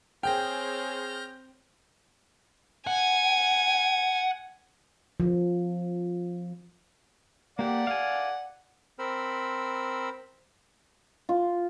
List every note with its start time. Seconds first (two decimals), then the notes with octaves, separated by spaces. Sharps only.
0.23 C4 G#4 C#5 G5 F6 G6 A#6
2.87 F#5 G#5
5.20 F3
7.59 A#3 G4 D5 F#5
7.87 F5 G#5
8.99 C4 A#4 C5 B5 E6
11.29 F4